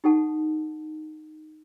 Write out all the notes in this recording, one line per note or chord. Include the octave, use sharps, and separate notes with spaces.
D#4 G4 A4 F#5 A5